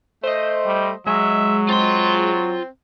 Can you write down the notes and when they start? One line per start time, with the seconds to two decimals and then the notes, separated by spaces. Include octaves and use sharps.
0.24 A3 C5 D#5
0.66 G3
1.07 F#3 G#3 E5
1.69 C4 F4 C6